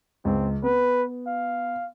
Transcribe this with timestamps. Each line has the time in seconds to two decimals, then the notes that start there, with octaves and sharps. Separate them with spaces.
0.25 C#2 C4
0.63 B3 B4
1.27 F5